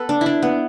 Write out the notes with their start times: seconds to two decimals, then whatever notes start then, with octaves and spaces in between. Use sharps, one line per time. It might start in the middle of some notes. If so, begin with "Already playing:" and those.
Already playing: B3 A4 B4
0.09 D4
0.21 E4
0.26 D4
0.43 B3